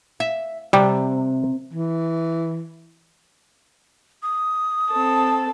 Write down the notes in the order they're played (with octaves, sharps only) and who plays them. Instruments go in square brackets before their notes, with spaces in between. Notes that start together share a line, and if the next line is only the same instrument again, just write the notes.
[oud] E5
[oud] C3 [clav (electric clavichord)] G3 G4
[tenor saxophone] E3
[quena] D#6
[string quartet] C4 A4 A5